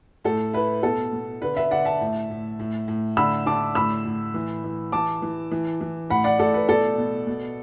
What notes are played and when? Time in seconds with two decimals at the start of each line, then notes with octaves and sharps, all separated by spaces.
0.24 A2 A4
0.53 E4 B4
0.83 B2 A4
1.13 B2
1.42 D3 B4
1.57 B4 E5
1.71 D3 D5 F#5
1.85 E5 A5
2.01 A2
2.30 A2
2.59 A2
2.88 A2
3.17 D3 B5 E6
3.46 D3 A5 D6
3.75 A2 B5 E6
4.05 A2
4.34 E3
4.64 E3
4.92 E3 A5 D6
5.22 E3
5.51 E3
5.81 E3
6.10 A2 F#5 B5
6.24 D5 F#5
6.39 A2 A4 D5
6.54 B4
6.69 B2 A4 D5
6.98 B2
7.27 B2